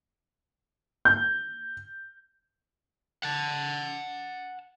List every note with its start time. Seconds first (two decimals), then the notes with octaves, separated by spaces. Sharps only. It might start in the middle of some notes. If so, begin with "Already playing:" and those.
1.05 G6
3.23 F#5 A5